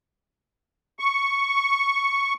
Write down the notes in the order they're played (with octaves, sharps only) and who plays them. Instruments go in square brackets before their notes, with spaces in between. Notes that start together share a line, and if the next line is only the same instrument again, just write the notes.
[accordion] C#6